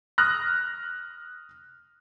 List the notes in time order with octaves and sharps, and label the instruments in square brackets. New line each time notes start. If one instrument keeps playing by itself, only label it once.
[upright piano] D#6 F6 F#6 A#6